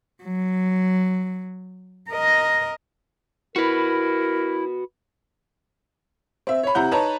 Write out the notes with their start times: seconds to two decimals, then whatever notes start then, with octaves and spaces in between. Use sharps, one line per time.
0.24 F#3
2.09 A#4 D#5
3.56 E4 F#4 A#4 B4
6.47 C4 E5
6.63 C#5 B5
6.75 C3 E4 F#5 A#5 G6
6.91 D#4 B4 C#5 A5 A#5